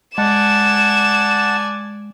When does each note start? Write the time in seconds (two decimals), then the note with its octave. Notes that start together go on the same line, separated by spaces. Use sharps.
0.18 G#3 D5 F#5 G#5 A5 E7